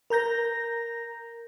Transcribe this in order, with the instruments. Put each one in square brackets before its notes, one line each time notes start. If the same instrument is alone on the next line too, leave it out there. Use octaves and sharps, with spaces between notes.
[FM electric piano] A#4 A#5 G6 A#6